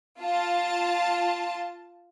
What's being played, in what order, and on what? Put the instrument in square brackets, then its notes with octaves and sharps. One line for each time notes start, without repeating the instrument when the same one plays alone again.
[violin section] F4 A5